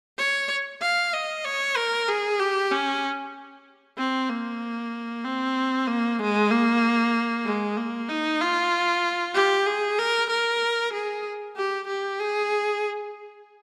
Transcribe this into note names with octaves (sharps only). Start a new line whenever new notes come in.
C#5
F5
D#5
C#5
A#4
G#4
G4
C#4
C4
A#3
C4
A#3
G#3
A#3
G#3
A#3
D#4
F4
G4
G#4
A#4
A#4
G#4
G4
G4
G#4